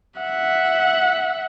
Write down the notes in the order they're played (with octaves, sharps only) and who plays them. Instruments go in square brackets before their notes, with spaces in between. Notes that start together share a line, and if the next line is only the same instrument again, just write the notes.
[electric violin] E5 F#5